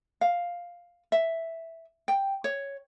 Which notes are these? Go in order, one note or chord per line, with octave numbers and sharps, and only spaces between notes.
F5
E5
G5
C#5